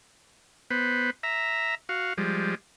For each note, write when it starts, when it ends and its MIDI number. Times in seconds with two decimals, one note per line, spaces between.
0.70 1.10 59
0.70 1.10 71
0.70 1.10 72
1.23 1.75 76
1.23 1.75 82
1.89 2.13 66
1.89 2.13 77
2.18 2.55 53
2.18 2.55 55
2.18 2.55 56